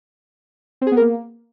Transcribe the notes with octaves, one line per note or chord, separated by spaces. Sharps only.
C4
G#4
B3
A#4
A#3